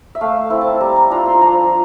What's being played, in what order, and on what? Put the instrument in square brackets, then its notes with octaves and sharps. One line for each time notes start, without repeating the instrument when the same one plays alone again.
[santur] E5
A3 F5
C4 E4
A5
G3 A#5
A#5
D4 F4 A#5
C6
F3 A#5